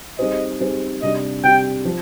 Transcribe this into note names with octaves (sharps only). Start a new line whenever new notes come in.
G3 C4 D#4 G#4 C5 D#5
G3 C4 D#4 G#4 C5
C3 G3 D4 G4 D#5
C3 G3 D4 G4 G5
F3